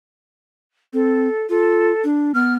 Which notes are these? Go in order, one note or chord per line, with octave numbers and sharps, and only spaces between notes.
C4 A4
F4 A4
D4
B3 F6